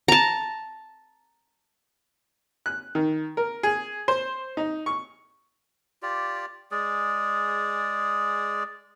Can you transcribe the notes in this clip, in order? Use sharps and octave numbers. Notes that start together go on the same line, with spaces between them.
A5 A#5
F#6
D#3
A#4
G#4
C5
D#4
C#6
F4 G4 D5
G#3 G#4 D5